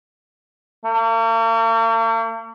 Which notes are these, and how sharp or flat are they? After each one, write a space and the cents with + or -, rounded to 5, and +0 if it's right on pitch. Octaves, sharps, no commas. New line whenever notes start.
A#3 -45